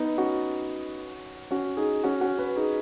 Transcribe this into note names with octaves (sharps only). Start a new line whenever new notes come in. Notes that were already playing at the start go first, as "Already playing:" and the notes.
Already playing: B3 D#4
C#4 F#4
C#4 F#4
D#4 G#4
C#4 F#4
C#4 F#4
F#4 B4
D#4 G#4